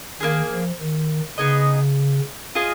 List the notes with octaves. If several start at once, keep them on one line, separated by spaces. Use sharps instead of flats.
D#3 A#3 F4 G#4
F3
D#3
C#3 B3 D#4 G#4 D#5
F4 G#4 D#5